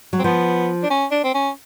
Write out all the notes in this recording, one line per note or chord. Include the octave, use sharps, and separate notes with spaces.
F#3
C4
F3 B3
D4
C#4
D4
C4
C#4